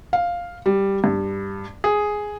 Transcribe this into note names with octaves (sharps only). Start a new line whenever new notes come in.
F5
G3
G2
G#4